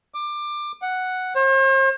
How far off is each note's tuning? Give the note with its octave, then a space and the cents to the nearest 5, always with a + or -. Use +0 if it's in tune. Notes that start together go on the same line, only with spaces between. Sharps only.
D6 +20
F#5 +0
C5 +45